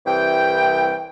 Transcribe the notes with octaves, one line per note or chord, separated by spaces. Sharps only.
C2 E3 G5